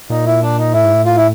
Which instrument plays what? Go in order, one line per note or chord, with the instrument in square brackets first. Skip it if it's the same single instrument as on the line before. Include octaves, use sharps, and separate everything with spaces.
[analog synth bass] A#2 [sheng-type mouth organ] D#4
[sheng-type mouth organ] E4
D4
D#4
[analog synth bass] A2 [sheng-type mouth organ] E4
[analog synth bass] G#2
A2
[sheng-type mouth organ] F4
E4